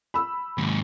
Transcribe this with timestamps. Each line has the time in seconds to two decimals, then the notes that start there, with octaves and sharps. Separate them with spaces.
0.14 B5 E6
0.58 D#2 G#2